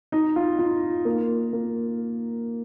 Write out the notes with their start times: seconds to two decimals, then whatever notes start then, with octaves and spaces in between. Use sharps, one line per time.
0.12 D#4
0.36 F4
0.59 F4
1.05 A#3
1.53 A#3